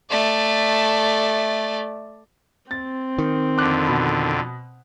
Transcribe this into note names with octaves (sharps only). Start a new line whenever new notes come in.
A3 D5
C4 A6
D#3
F2 D3 D6 F#6
B2 B5